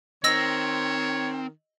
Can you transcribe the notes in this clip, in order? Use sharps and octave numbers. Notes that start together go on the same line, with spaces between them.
D#3 C4 C#5 D#5 E6 A#6